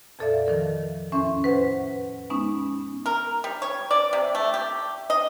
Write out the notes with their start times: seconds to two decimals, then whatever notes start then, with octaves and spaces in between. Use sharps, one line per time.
0.19 F2 A#2 A4 D5 E5 F5
0.47 D#3 F3 A#4
1.12 E2 A2 C#4 E5 C6
1.43 E2 B4 C5 F#5
2.30 G#3 B3 C#4 D#4
3.06 A#4
3.44 G3
3.62 C#5
3.91 D5
4.13 C3
4.35 A3
4.54 G4
5.10 D#5